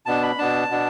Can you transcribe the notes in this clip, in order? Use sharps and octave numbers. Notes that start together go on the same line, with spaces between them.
B2 B3 D4 A5
B5
B2 B3 D4 A5
B2 B3 D4